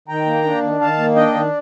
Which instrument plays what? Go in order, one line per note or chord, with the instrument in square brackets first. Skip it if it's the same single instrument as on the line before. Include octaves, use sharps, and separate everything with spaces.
[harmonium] D#3 G5 A#5
A#3
D4
D#3
D#3 F5 A5
A#3
D4 D#5 G5
D#3